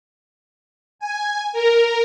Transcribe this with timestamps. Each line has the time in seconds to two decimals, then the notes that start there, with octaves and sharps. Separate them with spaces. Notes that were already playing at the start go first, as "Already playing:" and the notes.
0.99 G#5
1.53 A#4